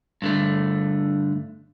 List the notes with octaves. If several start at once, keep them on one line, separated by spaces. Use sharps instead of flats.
G2 D3 A3